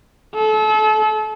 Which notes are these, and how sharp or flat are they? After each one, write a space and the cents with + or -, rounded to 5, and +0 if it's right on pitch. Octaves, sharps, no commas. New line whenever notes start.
A4 -35